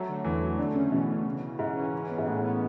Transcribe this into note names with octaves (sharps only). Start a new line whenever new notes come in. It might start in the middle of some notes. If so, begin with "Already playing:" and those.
Already playing: F#3 A3
D3
E2 E3
F#3
D3 A3
C#3 C#4
B2 E3
E3
C#3
C#3
G#2 C#4
C#4
E3
B3
G#2
A2 E3
B3